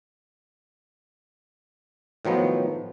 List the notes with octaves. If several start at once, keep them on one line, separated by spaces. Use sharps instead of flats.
A2 D#3 F3 F#3 B3